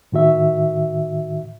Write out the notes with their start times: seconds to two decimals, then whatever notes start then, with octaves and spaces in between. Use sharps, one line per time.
0.12 A2 D#3 F#4 E5